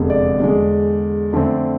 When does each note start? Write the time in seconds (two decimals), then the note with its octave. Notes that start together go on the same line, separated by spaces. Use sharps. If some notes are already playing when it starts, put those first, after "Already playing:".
Already playing: F1 E2 D3 G#3 B3
0.10 D5
0.40 E2 D3 G#3
1.32 F2 D3 A3 C4